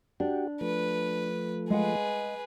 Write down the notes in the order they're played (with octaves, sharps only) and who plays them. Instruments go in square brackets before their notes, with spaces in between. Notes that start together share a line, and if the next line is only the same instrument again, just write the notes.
[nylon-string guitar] D4 [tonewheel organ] F#4 G4
[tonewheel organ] F3 A3 [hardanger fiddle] B4
[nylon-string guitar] G#3 F5 F#5 [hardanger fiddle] G#4 B4